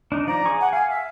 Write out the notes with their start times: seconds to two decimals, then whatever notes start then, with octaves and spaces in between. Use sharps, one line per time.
0.12 D4 D#4
0.27 F3 D5 A#5
0.45 G#4 C#6 D6
0.61 F#5
0.73 F5 G#5
0.90 E5